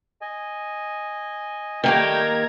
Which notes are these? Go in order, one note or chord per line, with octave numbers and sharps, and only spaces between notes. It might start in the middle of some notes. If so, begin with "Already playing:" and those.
D#5 G#5
D#3 G3 A3 A#3 G4 G5 A#5 G#6